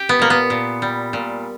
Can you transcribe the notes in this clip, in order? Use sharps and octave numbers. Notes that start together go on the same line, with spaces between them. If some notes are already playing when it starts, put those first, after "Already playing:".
Already playing: G4
B3
A#2 A#3
B3
A#2
G3
A#2